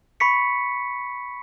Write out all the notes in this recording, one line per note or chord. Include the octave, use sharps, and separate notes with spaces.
B5 C#6 B6 C#7